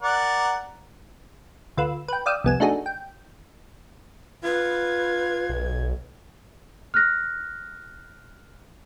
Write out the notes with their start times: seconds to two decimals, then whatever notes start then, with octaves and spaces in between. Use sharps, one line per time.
0.03 A#4 D5 F#5
1.77 D2 F4 B4 E6
2.08 B4 G5
2.26 D5 F5 G5 D#6 E6
2.44 C2 F2 B3 G#5 E7
2.60 A3 D4 D#4 F#4 G#4
2.86 G5
4.44 F4 B4 G#6
5.50 B1
6.94 F6 F#6 A#6